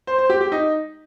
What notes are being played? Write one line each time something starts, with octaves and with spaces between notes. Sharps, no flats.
C5
C5
G4
G4
D#4